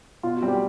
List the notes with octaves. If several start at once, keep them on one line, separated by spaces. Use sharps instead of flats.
B2 F4
F#4
G3 C4
G4